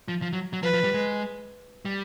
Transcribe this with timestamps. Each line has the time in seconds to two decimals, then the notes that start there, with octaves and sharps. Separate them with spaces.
0.08 F3
0.22 F3
0.33 F#3
0.53 F#3
0.63 F3 B4
0.73 F3
0.84 G3
0.94 G#3
1.85 G3